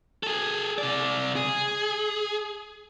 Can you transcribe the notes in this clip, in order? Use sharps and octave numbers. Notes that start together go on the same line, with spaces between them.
G#4 A4
C3 D5
G#4